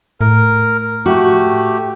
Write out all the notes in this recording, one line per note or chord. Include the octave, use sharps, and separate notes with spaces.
A2 A#4
A3 F#4 G4